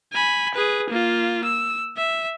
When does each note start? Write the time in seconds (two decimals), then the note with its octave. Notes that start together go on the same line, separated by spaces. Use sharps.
0.13 G#5 B5
0.55 G#4 B4
0.90 A#3 F4
1.44 E6
1.97 E5